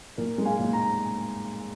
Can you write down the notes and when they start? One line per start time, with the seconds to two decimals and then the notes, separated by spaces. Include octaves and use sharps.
0.18 A#2 A#4
0.38 G#3
0.45 F5 G#5
0.59 A#2
0.73 A#5